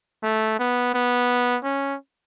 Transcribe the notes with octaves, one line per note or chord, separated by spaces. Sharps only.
A3
B3
B3
C#4